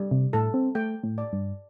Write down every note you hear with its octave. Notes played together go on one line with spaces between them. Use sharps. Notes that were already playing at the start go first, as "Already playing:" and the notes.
Already playing: G3
C3
A2 A4
C4
A3 G5
A2
D5
G2